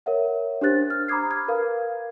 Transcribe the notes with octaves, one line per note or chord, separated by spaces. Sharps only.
A#4 C#5 E5 F#5
D4 G4 C5 F#6 A6
F6
A#5 B5 D6 D#6 G#6 C7
F6 G#6
A#4 B4 F5